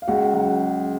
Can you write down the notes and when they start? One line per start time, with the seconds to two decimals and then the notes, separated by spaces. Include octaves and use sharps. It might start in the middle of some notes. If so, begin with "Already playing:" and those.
0.02 F5
0.07 C#2 F#4 F#5
0.33 C#3 F#3 F#4 F#5